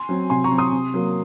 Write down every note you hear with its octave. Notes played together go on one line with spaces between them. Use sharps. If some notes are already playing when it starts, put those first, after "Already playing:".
Already playing: G#5 C6
F#3 C4
C3 G#5 C6
A#5 C#6
F#3 C4
C6 D#6
C3
F#3 A#3